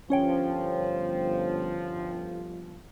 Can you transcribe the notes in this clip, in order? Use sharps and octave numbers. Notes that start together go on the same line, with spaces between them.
G1 F3 C#4 C#5 G5